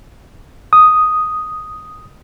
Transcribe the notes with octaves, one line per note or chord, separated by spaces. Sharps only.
D#6